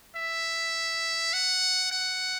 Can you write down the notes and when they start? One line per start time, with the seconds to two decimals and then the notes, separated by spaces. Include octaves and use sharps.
0.16 E5
1.33 F#5
1.92 F#5